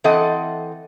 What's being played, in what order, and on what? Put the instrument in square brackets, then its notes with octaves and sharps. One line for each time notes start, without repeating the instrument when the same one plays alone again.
[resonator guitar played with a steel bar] E3 C4 A4 D#5 F#5